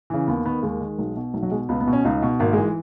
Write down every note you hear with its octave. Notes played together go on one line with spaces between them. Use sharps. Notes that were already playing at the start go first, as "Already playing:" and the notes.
C#3 E3
D#2 B3
D#3 B3
D#2 G#3
D#3
B1
B2
B1
F#3
B2 G#3
C#2 B3
B3
B2
C#4
C#2 D#4
B2
G#1 A#3
E3 G#3